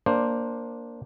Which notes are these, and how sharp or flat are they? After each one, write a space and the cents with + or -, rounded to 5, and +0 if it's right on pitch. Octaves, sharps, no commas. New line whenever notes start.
A#3 +0 D4 -5 C5 +10